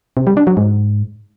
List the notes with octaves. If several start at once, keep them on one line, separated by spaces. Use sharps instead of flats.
C3
G3
D4
F#3
G#2